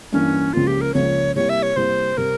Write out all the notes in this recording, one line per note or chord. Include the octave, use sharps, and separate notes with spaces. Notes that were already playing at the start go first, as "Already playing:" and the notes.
G2 E3 A#3 C#4
C#2 C#3 F3 A#3 F4
G4
A#4
C#2 C#3 F3 A#3 C#5
C3 G3 A#3 E4 C#5
E5
C#5
C3 G3 A#3 E4 C5
C3 G3 C4 A#4